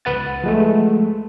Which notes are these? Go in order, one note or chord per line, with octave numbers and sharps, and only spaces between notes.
C#2 B4 F#5 A6
F3 G#3 A3